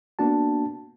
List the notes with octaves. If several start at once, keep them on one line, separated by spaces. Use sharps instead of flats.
A#3 B3 D4 F#4 A5